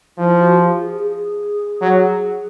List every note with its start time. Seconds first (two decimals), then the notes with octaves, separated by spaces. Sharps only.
0.18 F3 E4
0.38 F#4
0.59 G4
0.79 G#4
1.00 G#4
1.82 F#3